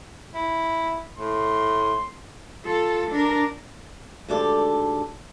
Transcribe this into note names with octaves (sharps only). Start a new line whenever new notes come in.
E4
A2 C6
F4 A4
D4 A#4
D2 G#2 G4 A4 D5